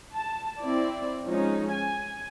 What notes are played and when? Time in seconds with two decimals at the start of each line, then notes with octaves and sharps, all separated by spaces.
0.14 A5
0.62 C4 E4 D5
1.25 F3 G#3 C#4 D#4
1.72 G#5